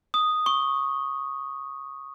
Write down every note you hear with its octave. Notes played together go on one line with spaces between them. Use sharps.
D#6
C#6